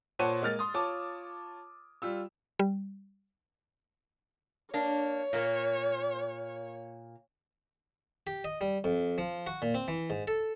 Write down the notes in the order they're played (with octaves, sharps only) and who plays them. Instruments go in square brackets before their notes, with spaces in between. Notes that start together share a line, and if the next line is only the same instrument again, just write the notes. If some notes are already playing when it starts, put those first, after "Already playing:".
[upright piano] A#2 C5 C#5 F#5 A5 D#7
G#3 A#3 F6 A6
C6 D#6
F4 C#5 A5 D6
G3 F4 E6
[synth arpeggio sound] G3
[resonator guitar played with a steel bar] A#3 D4 [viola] C#5
[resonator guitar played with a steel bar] A#2 A#3
[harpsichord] G4
D#5
G3
F2
F3
F#4
A#2
C4
E3
G#2
A4